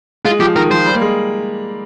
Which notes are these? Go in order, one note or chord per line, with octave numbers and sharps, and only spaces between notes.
G#3 F4
F3 G4
D#3 A#4
F3 C5
G3
A#3
G#3